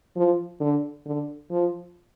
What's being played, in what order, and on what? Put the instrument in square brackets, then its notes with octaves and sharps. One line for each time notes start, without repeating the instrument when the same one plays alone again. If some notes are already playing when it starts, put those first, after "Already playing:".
[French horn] F3
D3
D3
F3